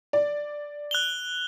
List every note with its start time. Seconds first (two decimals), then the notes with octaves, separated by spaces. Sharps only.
0.13 D5
0.91 F#6 F7 G7